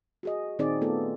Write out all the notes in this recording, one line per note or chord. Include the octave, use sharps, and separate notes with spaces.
F#4 G#4 D#5
A#2 D#3 C4 D#4 G#4 D5
A3 B3 F4 A4